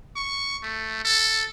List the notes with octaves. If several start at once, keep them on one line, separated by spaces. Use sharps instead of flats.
C#6
A3
A4